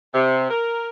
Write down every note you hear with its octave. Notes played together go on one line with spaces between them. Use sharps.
C3
A#4